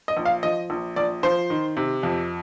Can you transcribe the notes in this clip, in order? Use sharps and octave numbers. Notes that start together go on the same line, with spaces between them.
D#5
A#1
F5
F3 D#5
A#1
A#1 D5
F3 C5
D#3
C3
F2